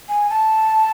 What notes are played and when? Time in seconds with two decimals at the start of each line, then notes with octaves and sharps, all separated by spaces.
0.09 G#5
0.30 A5